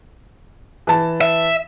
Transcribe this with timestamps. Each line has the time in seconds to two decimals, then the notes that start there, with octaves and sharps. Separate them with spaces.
0.87 E3 A5
1.21 E5